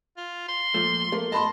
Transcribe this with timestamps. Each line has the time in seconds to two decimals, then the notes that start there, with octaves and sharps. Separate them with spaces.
0.17 F4
0.49 C6
0.74 A#2 F3 A3
1.12 A3 A#3
1.32 D#5 A5 B5 C6